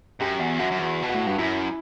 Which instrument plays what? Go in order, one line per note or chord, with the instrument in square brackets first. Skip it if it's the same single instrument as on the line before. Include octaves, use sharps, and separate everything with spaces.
[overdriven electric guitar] F#2 [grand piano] G4
[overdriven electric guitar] E2 [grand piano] F#4
[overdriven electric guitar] F#2 [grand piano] F#4
[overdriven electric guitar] F#2
[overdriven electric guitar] E2 [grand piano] F#4
[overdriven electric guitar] B2
[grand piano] F#4
[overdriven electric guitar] A2
G2
[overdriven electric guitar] F#2 [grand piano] E4